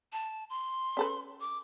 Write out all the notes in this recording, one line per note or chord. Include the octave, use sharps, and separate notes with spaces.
A5
C6
C#4 A4 B4
D6